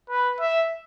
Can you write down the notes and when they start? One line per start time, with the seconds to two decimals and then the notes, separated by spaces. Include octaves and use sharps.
0.10 B4
0.40 E5